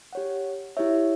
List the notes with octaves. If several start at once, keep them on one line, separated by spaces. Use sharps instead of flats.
G4 C#5 F#5
E4 G4 C#5 E5